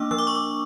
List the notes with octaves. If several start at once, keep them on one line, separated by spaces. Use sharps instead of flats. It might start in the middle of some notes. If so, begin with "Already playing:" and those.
Already playing: A#3 D4 D6 E6
F3 E6
D6
C#6
D6